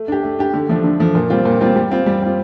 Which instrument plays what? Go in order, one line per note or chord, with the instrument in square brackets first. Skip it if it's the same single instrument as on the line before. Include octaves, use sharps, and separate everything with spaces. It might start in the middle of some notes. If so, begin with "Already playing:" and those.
Already playing: [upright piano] A3
D4 G4
A3
D4 G4
D3
F3 A3 D4
D3
F3 A3 D4
A#2
G3 C4 F4
A#2
G3 C4 F4
G3
C4 F4
G3
C4 F4